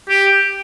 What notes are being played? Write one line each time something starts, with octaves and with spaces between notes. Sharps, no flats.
G4